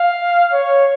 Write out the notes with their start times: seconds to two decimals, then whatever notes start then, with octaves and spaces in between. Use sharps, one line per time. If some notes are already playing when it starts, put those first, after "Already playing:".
Already playing: F5
0.53 C#5